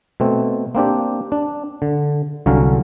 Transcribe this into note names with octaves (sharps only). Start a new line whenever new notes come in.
B2 A3 C4
A#3 C4 D4 G4
D4
D3
C2 D3 F#3 C#4 F5 A#5